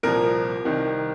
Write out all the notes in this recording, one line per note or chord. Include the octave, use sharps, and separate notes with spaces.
C2 A#2 F3 A#4
C2 C3 D#3